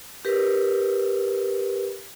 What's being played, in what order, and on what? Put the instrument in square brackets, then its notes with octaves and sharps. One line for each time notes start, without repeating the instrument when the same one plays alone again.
[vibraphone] G4 A#4 B4